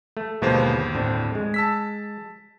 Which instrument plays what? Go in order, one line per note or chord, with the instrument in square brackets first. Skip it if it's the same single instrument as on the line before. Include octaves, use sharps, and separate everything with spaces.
[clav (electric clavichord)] A3
[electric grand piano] G1 D#2 C5 [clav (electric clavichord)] B2 G#3 A#3
[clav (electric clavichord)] A2 C4 D4
G#3
[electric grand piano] A5 E6 B6